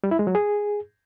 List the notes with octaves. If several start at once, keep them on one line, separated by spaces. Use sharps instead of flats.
G3
E4
G#3
F#3
G#4